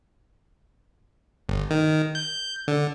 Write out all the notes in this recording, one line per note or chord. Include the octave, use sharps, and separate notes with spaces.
G1
D#3
G6
D3